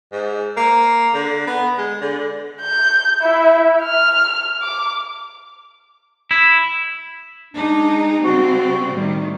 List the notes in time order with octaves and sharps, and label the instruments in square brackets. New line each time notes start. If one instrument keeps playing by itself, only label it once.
[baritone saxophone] G#2
A#3
D3
B3
G#3
D3
[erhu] G6
E4
F6
D6
[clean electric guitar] E4
[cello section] G#3 D#4 [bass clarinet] D4
[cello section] C#3 G3 C4 [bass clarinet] F#4
[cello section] A2 D#3 [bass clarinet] G3